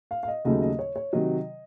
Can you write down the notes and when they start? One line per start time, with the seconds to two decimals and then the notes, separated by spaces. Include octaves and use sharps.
0.11 F5
0.23 F5
0.28 D#5
0.45 D#2 C#3 F#3 A3 D#5
0.62 D#5
0.79 C#5
0.96 C#5
1.13 C3 D#3 F#3 D#5